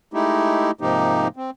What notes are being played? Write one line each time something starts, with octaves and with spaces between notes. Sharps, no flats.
G#3 A3 D#4 E4 G4
G#2 C3 F3 A#3 D#4 G4
C4